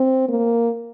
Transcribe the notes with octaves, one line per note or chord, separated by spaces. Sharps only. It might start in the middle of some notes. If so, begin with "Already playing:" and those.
Already playing: C4
A#3